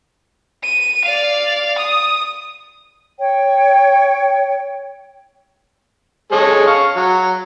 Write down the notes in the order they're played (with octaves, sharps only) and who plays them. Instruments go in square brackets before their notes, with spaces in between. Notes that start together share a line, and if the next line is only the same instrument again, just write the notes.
[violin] D#7
D5 F5
D#6
[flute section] C#5 G5
[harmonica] G#3 A4 C#5
F5 C#6
F#3